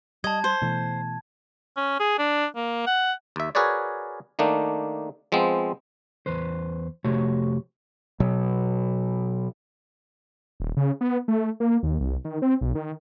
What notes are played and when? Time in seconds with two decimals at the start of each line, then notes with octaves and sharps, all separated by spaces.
0.24 G3 D#5 A5 G#6
0.44 C5
0.62 B2 E3 A3
1.77 C#4
2.00 G#4
2.19 D4
2.56 A#3
2.87 F#5
3.36 D#2 E5
3.55 F#4 G#4 A#4 B4 C#5 D5
4.39 D#3 A3 A#3 D4 D#4
5.32 F3 G#3 B3 C4
6.26 E2 B4 C5
7.04 F2 C3 A3 F#4 G4 C#5
8.20 B2 F#3
10.60 D#1
10.77 C#3
11.01 B3
11.28 A3
11.60 A#3
11.83 D#2
12.00 C2
12.25 D#3
12.42 C4
12.61 B1
12.75 D#3